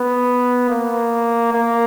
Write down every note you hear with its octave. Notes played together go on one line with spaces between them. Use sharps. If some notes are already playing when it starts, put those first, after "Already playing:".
Already playing: B3
A#3
A#3